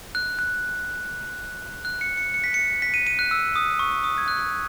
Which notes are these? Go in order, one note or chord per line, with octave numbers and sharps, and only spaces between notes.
F#6
F#6
F#6
C#7
C#7
C#7
B6
C#7
B6
D#7
D#7
F#6
E6
D#6
C#6
D#6
D#6
G#6
F#6